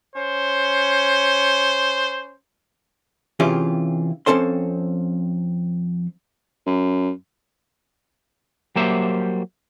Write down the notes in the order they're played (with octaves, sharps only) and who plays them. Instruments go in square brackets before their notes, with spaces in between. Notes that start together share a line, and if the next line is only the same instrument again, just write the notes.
[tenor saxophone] C#4 [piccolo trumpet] C5
[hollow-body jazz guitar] C3 E3 C#4 F4 G4 G#4
F2 C4 C#4 A4 C5 C6
[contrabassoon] F#2
[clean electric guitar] F#3 G3 A#3 G4 C5 E5